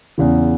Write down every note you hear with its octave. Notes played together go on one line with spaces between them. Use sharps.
E2 C#3 E3